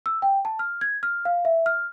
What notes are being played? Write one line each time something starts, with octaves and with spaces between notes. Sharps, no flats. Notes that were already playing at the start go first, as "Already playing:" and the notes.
E6
G5
A5
F6
G#6
F6
F5
E5
F6